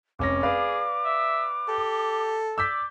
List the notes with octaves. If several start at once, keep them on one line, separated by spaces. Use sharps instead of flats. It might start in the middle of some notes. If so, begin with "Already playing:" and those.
F1 C#4 D6 A#6
G#4 B4 D5 F5
E5
G4 A4
D5 D6 E6 G6 B6